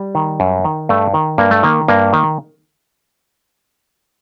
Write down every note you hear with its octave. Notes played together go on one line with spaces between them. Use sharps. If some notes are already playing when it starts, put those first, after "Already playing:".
Already playing: G3
D#3
F#2
D#3
G2 A3
D#3
G2 A#3
A3
D#3 A#3
G2 A#3
D#3